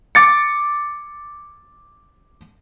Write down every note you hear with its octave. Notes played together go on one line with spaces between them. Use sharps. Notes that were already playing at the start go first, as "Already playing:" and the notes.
D6 A6 C#7